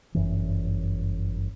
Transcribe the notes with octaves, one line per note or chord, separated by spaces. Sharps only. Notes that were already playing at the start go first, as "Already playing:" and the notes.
G1 F#2 E3